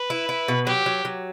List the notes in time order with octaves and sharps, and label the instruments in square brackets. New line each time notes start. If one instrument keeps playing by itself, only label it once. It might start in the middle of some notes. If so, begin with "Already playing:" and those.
Already playing: [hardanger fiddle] B4
[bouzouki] E4
E4
B2
[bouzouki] F#3 [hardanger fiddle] G4
[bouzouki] F#3
F#3